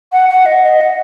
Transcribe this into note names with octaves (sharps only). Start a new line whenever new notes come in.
F#5
F#5
D#5
D#5
F#5